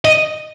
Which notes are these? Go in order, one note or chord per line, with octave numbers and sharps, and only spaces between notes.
D#5